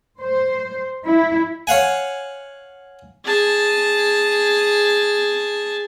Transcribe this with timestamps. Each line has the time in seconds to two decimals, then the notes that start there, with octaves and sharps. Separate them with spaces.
0.20 C5
1.05 E4
1.67 C#5 F5 F#5 G#5
3.24 G#4 A5